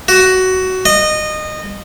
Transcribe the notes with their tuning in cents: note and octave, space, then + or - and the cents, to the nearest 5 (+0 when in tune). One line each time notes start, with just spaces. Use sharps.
F#4 +15
D#5 -20